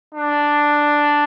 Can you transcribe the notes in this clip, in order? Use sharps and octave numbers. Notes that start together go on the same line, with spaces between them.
D4